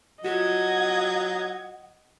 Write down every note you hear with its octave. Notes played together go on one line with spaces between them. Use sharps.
F#3 F4 F#4 D#5 F#5 G#6